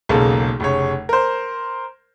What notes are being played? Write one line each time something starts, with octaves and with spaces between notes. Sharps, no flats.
E1 B1 C#3 A#3 A4
F1 C#3 C#5
A#4 C5